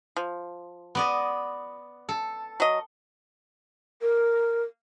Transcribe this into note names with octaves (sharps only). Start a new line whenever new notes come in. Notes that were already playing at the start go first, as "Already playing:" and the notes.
F3
B3 D5 D#5
A4
F#3 D#5
A#4